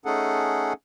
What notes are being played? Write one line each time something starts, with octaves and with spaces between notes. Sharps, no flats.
A3 C#4 D#4 G#4 A4 F#5